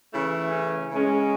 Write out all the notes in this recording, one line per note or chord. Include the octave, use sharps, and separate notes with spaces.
C#3 E3 A3 E4
C#4
C#3 G#3 C#4